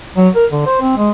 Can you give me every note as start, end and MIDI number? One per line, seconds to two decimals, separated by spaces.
0.17 0.29 54
0.35 0.46 70
0.52 0.63 50
0.66 0.78 72
0.81 0.96 60
0.97 1.11 56